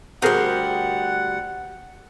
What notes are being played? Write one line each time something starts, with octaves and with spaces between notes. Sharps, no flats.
D2 G3 G#4 A#4 C5 F#5